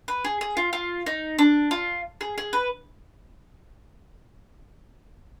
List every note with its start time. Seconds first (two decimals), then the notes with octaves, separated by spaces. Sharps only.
0.08 B4
0.25 G#4
0.41 G#4
0.57 F4
0.73 F4
1.06 D#4
1.39 D4
1.71 F4
2.21 G#4
2.38 G#4
2.53 B4